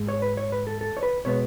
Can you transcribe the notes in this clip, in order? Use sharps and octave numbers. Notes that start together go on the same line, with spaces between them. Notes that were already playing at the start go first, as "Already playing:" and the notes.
Already playing: G#2 G#3
C#5
B4
C#5
B4
A4
A4
C#5
B4
B2 G#3 B3 C#5